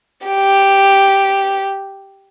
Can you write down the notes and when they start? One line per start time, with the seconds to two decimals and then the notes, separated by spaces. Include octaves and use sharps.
0.26 G4